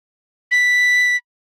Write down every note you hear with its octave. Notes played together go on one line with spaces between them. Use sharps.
B6